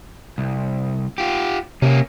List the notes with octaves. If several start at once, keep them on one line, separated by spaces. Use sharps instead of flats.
C2
F4 G4
C3 A#3 C#4